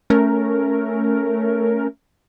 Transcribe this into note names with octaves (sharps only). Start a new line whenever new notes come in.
A3 C#4 A#4